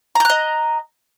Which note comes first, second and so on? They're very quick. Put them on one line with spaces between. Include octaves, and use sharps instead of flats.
A#5 G6 F#6 D#5